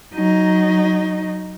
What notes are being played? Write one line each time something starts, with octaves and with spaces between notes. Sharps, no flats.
F#3 D#4